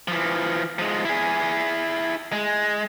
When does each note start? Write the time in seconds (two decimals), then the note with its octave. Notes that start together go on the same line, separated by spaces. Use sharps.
0.08 E3 F3
0.79 F3 G#3
1.05 E4 G#4
2.32 G#3